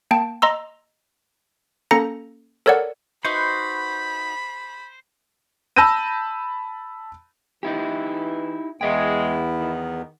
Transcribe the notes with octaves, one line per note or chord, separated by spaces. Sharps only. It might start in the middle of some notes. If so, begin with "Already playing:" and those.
A#3 G5 A5
D#5 A#5 C6 E6
A#3 C#4 A4 A#5 A#6 C#7
A4 A#4 C#5 D5 F#5
D#4 F#4 B4 C5 B5
A5 B5 E6 G6 A#6 D#7
E3 D#4 E4 G4
E2 G#3 B3 E4 E5 G5
D#3